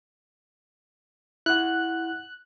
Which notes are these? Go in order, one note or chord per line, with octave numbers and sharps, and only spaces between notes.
E4 F#5 F#6